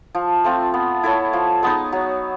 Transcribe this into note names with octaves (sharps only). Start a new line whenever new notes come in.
F3
A3 C4 F4
B3
E4 A4 C#5
F3
G#3 B3 D#4
F#3